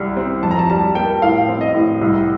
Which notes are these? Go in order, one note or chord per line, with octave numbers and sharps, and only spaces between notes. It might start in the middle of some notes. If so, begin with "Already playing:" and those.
Already playing: C2 G3
C4
F2 A5
A#5
A5
G3 A5
A#3 G5
A2 F5
C4
D#5
A2
C2